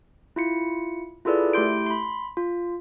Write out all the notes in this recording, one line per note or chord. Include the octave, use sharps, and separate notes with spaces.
E4 F4 C#7
E4 F4 G#4 A4 B4 D5
A3 E4 G4 C6 G6 D7
B5 C6
F4